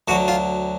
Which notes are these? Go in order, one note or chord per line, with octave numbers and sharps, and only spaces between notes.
D2 D3 F#3 F#4
F4